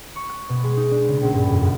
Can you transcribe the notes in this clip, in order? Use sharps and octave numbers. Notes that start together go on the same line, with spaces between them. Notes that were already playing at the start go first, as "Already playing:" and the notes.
C#6
F#6
B2
G#3
D#4
D4
C#3
A#1
G2
F2
F#2